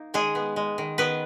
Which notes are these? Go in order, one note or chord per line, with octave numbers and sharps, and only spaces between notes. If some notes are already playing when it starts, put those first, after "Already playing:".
Already playing: A#3 D#4
D#3 G#3 G#4
B3
G#3
D#3
D#3 B3 B4